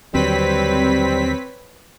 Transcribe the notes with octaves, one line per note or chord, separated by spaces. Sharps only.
D#2 D3 F#3 G3 C4 B4 C#5 B6